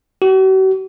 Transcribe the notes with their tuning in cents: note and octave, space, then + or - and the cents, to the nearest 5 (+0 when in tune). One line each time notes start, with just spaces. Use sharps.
F#4 +45